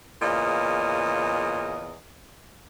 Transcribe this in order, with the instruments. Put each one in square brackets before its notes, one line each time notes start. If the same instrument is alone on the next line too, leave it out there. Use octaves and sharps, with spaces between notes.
[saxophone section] E2 A#2 C#3 D#5